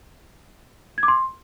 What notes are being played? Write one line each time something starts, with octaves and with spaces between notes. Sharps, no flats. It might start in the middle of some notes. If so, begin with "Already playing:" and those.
G#6
D6
C6